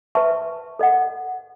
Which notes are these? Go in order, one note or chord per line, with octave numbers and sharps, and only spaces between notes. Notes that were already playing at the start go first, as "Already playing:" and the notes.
B4 E5 A5 C#6
A4 D#5 F#5